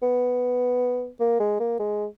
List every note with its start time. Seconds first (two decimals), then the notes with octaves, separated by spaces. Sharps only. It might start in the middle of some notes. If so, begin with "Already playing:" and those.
0.02 B3
1.20 A#3
1.39 G#3
1.60 A#3
1.79 G#3